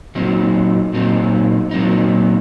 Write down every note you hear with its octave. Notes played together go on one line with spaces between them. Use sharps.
A#2 F#3 C4 D#4
A#2 F#3 C4 D#4
A#2 F#3 C4 D#4